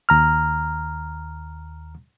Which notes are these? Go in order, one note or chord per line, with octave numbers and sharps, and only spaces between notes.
D#2 A#5 F6